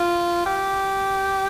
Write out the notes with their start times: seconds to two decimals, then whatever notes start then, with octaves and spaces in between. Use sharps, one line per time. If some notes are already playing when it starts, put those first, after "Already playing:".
Already playing: F4
0.46 G4